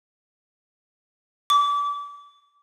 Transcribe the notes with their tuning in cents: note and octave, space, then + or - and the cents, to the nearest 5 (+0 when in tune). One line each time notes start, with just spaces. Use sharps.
D6 -30